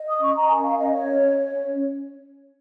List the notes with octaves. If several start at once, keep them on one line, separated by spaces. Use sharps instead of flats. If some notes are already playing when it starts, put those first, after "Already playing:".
Already playing: D#5
D#6
C#4 C#6
A#5
A#4 G#5
F5
C#4 D#5
C#5
C#4
C#5